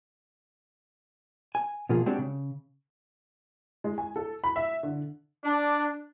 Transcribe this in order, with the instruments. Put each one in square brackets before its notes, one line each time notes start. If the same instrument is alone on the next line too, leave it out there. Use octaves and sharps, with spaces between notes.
[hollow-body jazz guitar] G#5
B2 F3 A#3 F4 G#4
G#3 C4 D4 F#4 G4 C5
C#3
[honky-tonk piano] G#3
G#5
A4
B5
E5
D3
[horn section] D4